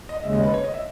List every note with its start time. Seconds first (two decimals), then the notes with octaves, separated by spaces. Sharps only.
0.09 D#5
0.23 D#2 C#3 G#3 E5
0.33 D#5
0.43 B4
0.54 C#5
0.64 D#5
0.74 E5